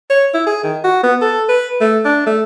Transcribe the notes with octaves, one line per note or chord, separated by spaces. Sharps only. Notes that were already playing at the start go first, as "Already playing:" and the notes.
C#5
E4
G#4
D#3
F#4
B3
A4
B4
A3
D4
A3